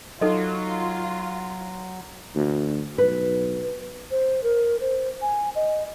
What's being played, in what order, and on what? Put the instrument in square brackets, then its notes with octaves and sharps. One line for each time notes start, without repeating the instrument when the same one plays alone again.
[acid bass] F#3 [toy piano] D#4 A4 D#5 [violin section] F4
[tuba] D2
[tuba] B1 [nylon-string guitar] B4
[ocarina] C5
A#4
C5
G#5
D#5